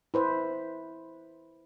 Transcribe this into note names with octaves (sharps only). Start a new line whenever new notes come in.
E4 B4 C5